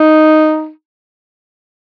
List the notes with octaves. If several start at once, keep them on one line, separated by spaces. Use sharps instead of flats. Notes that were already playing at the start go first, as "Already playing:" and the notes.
Already playing: D#4